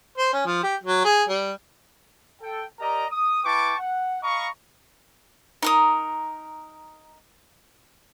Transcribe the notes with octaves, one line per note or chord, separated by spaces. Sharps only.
C5
C#4
F3
G4
F#3
G#4
G3
A4 G5
G4 A#4 D5 D#5 A#5
D#6
E4 B4 G5 A5 C#6 D6
F#5
D#5 F5 A#5 B5 C#6
D#4 A#4 D#6